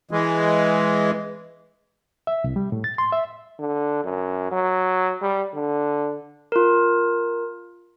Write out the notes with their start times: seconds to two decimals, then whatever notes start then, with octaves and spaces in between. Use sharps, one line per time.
0.11 E3 G#3
2.27 E5
2.44 C2
2.56 G3
2.72 A2
2.84 A6
2.98 C6
3.12 E5
3.59 D3
4.04 F#2
4.51 F#3
5.22 G3
5.54 D3
6.52 F4 A#4